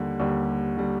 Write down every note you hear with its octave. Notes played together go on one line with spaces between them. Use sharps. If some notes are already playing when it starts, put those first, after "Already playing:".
Already playing: D#2 D3 G3
D#2 D3 G3
D3 G3